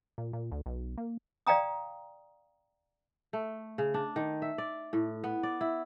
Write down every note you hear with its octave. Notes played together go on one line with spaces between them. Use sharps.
A#2
A#2
D2
B1
A#3
D5 F5 G5 A#5 D#6
A3
C#3
D4
D#3
E5
D5
A2
B3
D5
E4